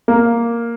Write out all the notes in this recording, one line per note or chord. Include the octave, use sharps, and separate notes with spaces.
A#3